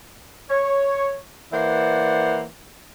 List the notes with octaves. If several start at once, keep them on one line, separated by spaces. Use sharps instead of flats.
C#5
E3 A#3 C5 D5 F#5